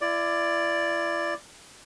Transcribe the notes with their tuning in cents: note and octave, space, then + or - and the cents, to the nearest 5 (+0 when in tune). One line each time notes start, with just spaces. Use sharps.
E4 +40 D5 +5